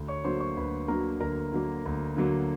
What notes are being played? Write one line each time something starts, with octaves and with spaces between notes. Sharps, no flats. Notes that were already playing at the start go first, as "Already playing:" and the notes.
Already playing: D2
C#5 C#6
D3 F#3 A#3 C5 C6
C#5 C#6
D2 B4 B5
D3 F#3 A#3 A#4 A#5
D2 A#4 A#5
D3 F#3 A#3
D2
D3 F#3 A#3